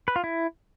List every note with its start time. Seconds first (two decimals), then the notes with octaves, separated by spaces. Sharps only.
0.08 B4
0.16 F4
0.24 E4